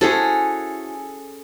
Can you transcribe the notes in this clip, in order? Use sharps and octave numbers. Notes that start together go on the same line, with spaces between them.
C#4 E4 F#4 G#4 A4 C5